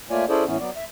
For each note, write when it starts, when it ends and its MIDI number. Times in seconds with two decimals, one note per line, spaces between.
0.11 0.25 57
0.11 0.25 58
0.11 0.25 65
0.11 0.25 73
0.11 0.25 74
0.11 0.25 80
0.29 0.44 61
0.29 0.44 64
0.29 0.44 68
0.29 0.44 69
0.29 0.44 72
0.29 0.44 74
0.46 0.57 45
0.46 0.57 52
0.46 0.57 59
0.46 0.57 61
0.60 0.70 54
0.60 0.70 59
0.60 0.70 74
0.76 0.84 76